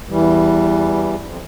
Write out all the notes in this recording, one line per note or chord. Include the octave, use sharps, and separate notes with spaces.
E2 E3 G3
F2